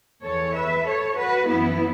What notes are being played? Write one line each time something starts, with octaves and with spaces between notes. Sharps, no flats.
E2 E3 A4 C#5
B4 E5
A4 C#5
F#4 B4
F#2 E3 B3 E4